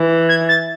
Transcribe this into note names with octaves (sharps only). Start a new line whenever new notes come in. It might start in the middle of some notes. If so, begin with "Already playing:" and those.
Already playing: E3
G#6
A6